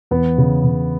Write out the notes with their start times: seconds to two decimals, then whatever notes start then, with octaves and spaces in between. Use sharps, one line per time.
0.11 E2 B3
0.38 C#3
0.64 C#3